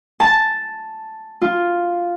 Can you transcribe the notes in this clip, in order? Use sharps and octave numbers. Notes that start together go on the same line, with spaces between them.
A5
F4